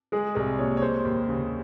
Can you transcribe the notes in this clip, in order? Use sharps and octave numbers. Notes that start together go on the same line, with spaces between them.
G#3 G#4
C2 G#4
A#2 C#5
C#5
G#3 C5
D#2
C#3